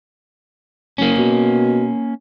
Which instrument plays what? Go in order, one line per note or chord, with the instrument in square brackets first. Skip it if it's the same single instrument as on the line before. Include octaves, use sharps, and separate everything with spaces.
[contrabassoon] F#1 [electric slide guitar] A#3 C#4
[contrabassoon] B2